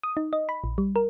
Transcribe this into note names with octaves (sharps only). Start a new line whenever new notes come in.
D#6
D#4
D#5
B5
A#1
G3
A#4